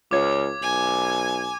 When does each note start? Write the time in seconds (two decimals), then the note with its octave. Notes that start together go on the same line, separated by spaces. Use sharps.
0.11 C#2 F4 C#5 D6 G#6
0.62 B1 G#5